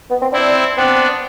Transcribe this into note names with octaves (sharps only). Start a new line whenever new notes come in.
B3
C4
C4 D4 E4
B3 C4 D4